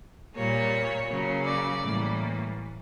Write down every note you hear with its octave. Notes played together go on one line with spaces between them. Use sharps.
A#2 G3 A#3 C#5
C#3 F#3 A#3
D5
A2 E3 G3 A#3